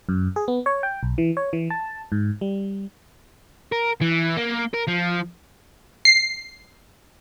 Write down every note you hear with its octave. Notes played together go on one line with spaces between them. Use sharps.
F#2
G#4
B3
C#5
G5
B1
E3
C#5
E3
A5
G#2
G3
A#4
E3
A#3
A#4
F3
C7